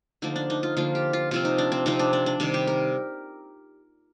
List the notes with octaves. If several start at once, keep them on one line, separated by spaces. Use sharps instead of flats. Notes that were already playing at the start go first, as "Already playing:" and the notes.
D3 F3 A#3 D#4
D4
D#4
F4
D3 F3 A#3 F4
G4
F4
C3 F3 C4 F4
D#4
D4
C4
C3 F3 C4 D#4
D4
D4
D4
C3 D#3 G3
G4
A#4